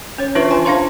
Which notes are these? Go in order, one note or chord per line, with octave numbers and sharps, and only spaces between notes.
C#4 C#5
E3 D4 F4 B4 E5 C#6
G#5 A5 C6
D4 C5 F5 A#5 C6